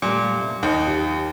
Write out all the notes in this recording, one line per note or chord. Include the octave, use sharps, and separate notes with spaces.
A#2 G3 A3
C3
D#2 D#3 D#4
G4